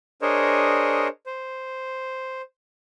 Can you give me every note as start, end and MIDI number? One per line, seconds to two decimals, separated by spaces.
0.22 1.08 62
0.22 1.08 68
0.22 1.08 70
0.22 1.08 72
0.22 1.08 73
0.22 1.08 75
1.26 2.42 72